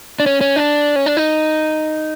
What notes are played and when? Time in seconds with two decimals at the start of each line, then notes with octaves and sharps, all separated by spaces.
0.20 D4
0.26 C#4
0.41 C#4
0.56 D4
0.96 C#4
1.06 D4
1.17 D#4